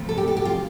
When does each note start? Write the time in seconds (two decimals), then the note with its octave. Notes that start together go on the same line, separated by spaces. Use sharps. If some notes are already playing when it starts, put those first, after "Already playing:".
Already playing: F2 C3 F3 A3
0.09 A4
0.17 G4
0.28 A4
0.37 G4
0.45 F4